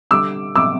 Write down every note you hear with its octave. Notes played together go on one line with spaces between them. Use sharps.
D3 G3 D6 E6
D6 E6